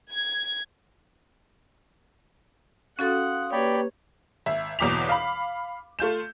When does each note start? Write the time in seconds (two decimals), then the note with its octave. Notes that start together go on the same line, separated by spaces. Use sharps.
0.12 G#6
2.99 C#4 F#4 A4 F5 F#5 C6 D#6
3.52 A#3 G4 B4 C#5 D5 G5 B5
4.46 G#1 E5
4.79 G1 E2 B2 D6 B6 F7
5.09 F5 B5
5.99 A3 F4 G6 E7